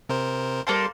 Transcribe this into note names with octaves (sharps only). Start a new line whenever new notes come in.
C3 A#4 C5
G3 A#3 A4 C5 C6